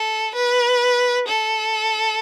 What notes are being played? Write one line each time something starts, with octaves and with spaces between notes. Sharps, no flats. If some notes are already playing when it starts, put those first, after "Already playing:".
Already playing: A4
B4
A4